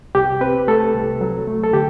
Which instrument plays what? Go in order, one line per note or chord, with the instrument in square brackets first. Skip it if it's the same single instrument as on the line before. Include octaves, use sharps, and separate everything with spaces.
[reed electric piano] C2 G4
C4 B4
A3 A4
C2
F#3
A3
A4
D3 G4